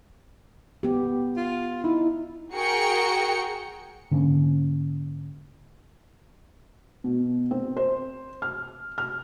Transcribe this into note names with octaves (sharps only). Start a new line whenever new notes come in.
B3 G4
F4
D#4 E4
F#4 G#4 A#4 G5 C#7
G#2 D3 A#3 C#4
B2
C4
C5
F6
F6